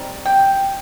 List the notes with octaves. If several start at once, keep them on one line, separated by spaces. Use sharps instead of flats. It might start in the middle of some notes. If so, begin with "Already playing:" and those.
Already playing: G3 C4 D#4
G5